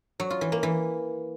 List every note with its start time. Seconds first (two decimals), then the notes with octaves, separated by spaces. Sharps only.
0.20 F#3
0.30 F4
0.41 E3
0.52 A#3
0.63 E3